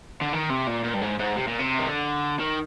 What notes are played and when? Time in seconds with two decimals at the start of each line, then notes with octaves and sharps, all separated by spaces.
0.21 D3
0.33 D#3
0.50 C3
0.67 A#2
0.84 A#2
0.95 G2
1.02 G#2
1.19 G#2
1.36 C3
1.47 A#2
1.59 C3
1.79 D#3
1.88 D3
2.40 D#3